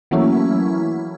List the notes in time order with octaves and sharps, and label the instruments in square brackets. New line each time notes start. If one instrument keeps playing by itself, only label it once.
[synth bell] E3 F#3 A3 A#3 C#4 E4